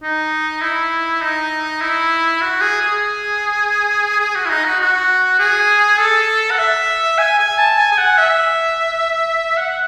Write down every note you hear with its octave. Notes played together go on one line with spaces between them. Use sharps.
D#4
E4
D#4
E4
F#4
G#4
G#4
G#4
F#4
E4
D#4
F#4
F#4
G#4
A4
F#5
E5
G#5
G#5
A5
G#5
G#5
F#5
E5
F#5